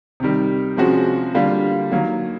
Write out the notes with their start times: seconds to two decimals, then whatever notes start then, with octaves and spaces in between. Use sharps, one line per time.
0.20 C3 D#3 G3
0.77 C3 F3 G#3 C#4 F#4
1.34 D3 G3 A#3 D4 F4
1.92 D#3 F#3 A#3